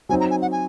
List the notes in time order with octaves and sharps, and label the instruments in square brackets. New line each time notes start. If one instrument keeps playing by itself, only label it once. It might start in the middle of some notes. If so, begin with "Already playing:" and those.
[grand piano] F#3 C4 D#4 [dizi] G#5
[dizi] A#5
G#5
F#5
G#5